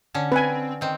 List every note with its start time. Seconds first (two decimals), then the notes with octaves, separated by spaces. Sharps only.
0.15 D3 C#4
0.32 C4 B4 G#5
0.81 D#3 C4